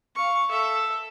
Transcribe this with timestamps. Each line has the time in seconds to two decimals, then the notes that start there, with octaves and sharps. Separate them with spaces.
0.15 F5 C#6
0.51 A4 E5